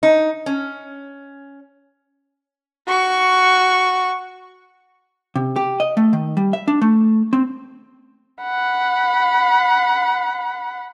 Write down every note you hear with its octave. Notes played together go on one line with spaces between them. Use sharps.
D#4
C#4
F#4 C#6
C3
G4
D#5
A3
D#3
G3
E5
D4
A3
C4
F#5 B5